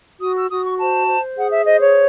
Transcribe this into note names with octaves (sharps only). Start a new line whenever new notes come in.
F#4 D#6
E6
F#4 D#6
C#6
C5 A5
C5
G#4 F#5
E5
C5 D#5
C#5